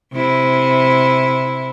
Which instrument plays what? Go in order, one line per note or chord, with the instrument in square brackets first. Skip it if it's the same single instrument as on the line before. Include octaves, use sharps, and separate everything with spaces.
[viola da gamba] C3 E4